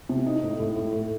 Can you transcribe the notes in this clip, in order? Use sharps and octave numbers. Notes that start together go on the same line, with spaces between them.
C3
D#4
A2
A2
A2
A2